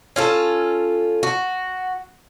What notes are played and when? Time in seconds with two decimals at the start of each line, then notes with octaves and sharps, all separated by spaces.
0.16 C#4 F4 A4
1.23 F#4